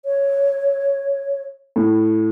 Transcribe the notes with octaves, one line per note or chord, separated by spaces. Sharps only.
C#5
A2